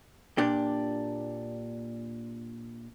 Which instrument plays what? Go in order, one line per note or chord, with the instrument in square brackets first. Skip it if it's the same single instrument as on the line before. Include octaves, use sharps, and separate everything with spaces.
[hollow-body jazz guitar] A#2 D4 G4